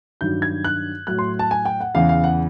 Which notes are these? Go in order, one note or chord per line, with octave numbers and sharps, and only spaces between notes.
G2 D#3 F#3 G6
G#6
F#6
A2 F#3 F#6
C6
A5
G#5
G5
F#5
E2 C#3 E3 F5
F5
F#5